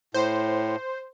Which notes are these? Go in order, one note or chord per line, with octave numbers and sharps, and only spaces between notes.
A2 C5